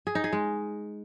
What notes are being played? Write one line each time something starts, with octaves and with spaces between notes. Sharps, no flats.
G#4
D#4
G#4
G#3